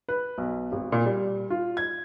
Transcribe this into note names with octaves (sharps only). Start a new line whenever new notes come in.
B4
B1
G#1
A#2
G3
F4
G#6